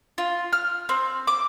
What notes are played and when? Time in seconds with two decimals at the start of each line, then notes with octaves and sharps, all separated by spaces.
0.18 F4
0.53 F6
0.89 C4
1.27 D6